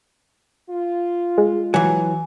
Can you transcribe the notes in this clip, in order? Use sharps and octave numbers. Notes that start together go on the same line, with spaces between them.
F4
G#3
E3 F#3 G#5